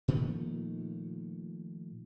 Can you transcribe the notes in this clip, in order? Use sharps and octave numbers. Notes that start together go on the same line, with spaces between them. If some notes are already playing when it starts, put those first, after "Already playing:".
A#2 D#3 F3 A3